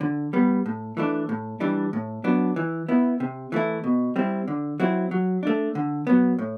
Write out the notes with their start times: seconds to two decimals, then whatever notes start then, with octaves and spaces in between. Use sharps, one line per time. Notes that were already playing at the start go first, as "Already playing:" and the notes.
0.01 D3
0.33 G3 B3
0.66 A2
0.97 E3 A3 D4
1.29 A2
1.60 E3 G3 D4
1.93 A2
2.24 F#3 B3 D4
2.56 E3
2.88 B3 E4
3.20 C3
3.52 E3 A3 E4
3.84 B2
4.16 G3 C4 E4
4.48 D3
4.80 F#3 C4 E4
5.11 F#3
5.43 A3 D4
5.75 D3
6.07 F#3 B3
6.39 A2